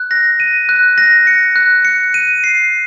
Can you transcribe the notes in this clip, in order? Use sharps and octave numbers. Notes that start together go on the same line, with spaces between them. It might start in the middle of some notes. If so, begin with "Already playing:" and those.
Already playing: F#6
A#6
D#7
F#6
A#6
C#7
F#6
C#7
D#7
C7